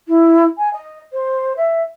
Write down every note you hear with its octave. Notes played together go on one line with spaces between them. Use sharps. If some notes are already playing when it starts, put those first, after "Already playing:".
E4
G#5
D#5
C5
E5